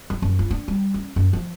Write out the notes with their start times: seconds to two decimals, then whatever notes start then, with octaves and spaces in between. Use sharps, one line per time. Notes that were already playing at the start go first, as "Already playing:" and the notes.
0.10 F#3
0.22 F#2
0.39 F4
0.51 D4
0.68 G3
0.94 C#4
1.16 F#2
1.33 F3